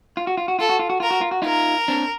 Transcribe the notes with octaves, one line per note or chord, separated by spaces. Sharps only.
F4
F#4
F4
F#4
F4 A4
F#4
F4
F#4
F4 A#4
F#4
F4
F#4
D#4 F4 A#4
C4 D4